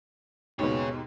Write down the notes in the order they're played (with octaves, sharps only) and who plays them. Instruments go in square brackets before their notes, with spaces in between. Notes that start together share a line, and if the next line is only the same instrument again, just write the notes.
[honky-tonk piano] D#2 G#2 B2 [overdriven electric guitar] G#4 C#5